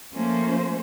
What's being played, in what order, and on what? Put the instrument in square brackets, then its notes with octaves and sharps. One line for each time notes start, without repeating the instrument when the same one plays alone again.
[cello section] F3 A3 A#3 C#4 C5